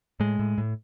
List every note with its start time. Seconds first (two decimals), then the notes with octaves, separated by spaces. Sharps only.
0.20 A2 G#3
0.39 A2
0.58 A2